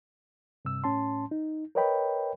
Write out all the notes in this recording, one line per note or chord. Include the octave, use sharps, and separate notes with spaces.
G2 C3 E6
A2 C#4 A5 C6
D#4
A#4 B4 C#5 D#5 G5 B5